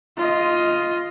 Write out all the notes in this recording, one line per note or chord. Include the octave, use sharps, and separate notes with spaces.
F4 D#5